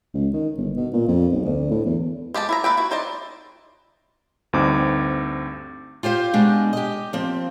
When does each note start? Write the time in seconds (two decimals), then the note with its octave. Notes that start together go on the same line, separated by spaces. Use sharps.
0.14 C#2
0.33 D#3
0.58 G1
0.77 B2
0.93 A#2
1.08 F2
1.32 B1
1.45 D2
1.71 A2
1.86 E2
2.34 G#3 G4 A#4 A5
2.49 E4 E5 A#5
2.64 A#3 B4 E5 G5
2.77 E4 F#4
2.91 D#4 C5 D5 D#5
4.53 D2 G2 C4 D#4 D6
6.03 F4 G4 C5 F5
6.33 B2 G#3 D4 G4
6.73 G4 D#5
7.13 F3 A#3 C4